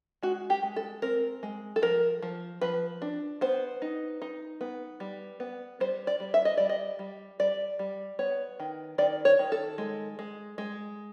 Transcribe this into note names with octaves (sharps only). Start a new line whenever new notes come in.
G#3 F#4
G4
G#3
A4
C4 A#4
G#3
A4
F3 A#4
F3
F3 B4
D4
B3 C5
D#4
D#4
B3
G3
B3
G3 C5
D5
G3
E5
D#5
G3 D5
D#5
G3
G3 D5
G3
B3 C#5
D#3
D#3 D5
C#5
D#3
A4
G#3
G#3
G#3